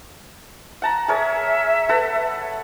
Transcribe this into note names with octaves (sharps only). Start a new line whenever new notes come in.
F#5 A5 A#5
G#4 A#4 C#5 E5
A4 B4 F#5